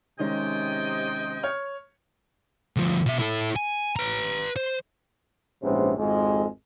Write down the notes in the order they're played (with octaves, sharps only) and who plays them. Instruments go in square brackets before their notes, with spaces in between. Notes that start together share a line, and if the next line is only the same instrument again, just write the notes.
[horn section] C3 D#5 [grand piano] D#3 G#3 C#4 [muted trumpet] G5
[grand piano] C#5 F6
[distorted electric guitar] D2 F3
B2 E5
E4 A4
G#5
B4 A#5
C5
[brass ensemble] A#1 G#2 C3 B3 C#4 C5
G#1 F2 G#3